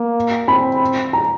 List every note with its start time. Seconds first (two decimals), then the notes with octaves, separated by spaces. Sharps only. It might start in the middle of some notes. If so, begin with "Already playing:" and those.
Already playing: A#3
0.48 C4 B5
1.13 A#5